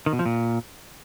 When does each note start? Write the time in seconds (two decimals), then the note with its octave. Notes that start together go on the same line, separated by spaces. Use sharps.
0.06 D#3
0.13 B2
0.19 F3
0.26 A#2